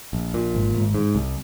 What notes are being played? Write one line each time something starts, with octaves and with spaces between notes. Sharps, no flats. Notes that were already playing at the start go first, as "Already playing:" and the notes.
A#1
A#2
G#1
G#1
G#2
C2